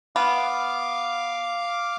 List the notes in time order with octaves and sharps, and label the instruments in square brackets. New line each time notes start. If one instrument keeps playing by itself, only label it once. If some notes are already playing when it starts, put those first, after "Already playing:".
[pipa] B3 [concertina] F5 D6